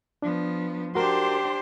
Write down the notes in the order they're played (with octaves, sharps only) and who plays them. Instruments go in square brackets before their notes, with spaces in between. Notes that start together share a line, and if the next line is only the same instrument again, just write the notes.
[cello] F3 B3 [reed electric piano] D4
[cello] D4 C5 [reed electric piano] F#4 A#4 [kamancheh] G4 C6